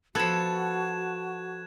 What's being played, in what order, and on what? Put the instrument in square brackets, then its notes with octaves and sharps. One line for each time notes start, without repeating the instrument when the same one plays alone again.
[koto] F3 B3 [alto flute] F#4 [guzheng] A4 [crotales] F#6 G#6 E7